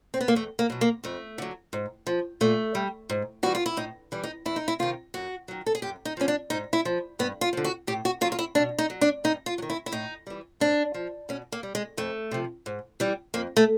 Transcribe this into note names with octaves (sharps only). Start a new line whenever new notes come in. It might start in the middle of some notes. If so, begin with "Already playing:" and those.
C4
B3
A#3
E2 A3
A#3
B2 F#3
A#3
F2 A3
D3 F#3
G#2
F3
A#2 A3
G3
G#2
E3 G3 F#4
F4
E4
A2 D#4
E3 G3
D#4
E2 E4
D#4
E4
C3 D#3 F4
F#2 F#4
D#3 F#3
A4
G#4
F#2 G4
D#4
D3 F3 C#4
D4
G#2 D#4
E4
F3
G2 B3
F4
D3 F3
F#4
A2 G4
F#4
F#3 F4
F4
E4
B2 D4
D#4
F#3
D4
G2 D#4
F4
F#3
D#3
E4
E4
A2 D#4
E3 G3
G#2 D4
F3
B2 C#4
A#3
G3
G#3
F2 A3
C3 F3
G#2
E3 G3
F2 A#3
A3